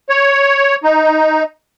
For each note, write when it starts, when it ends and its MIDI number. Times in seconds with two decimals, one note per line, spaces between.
0.09 0.75 73
0.84 1.43 63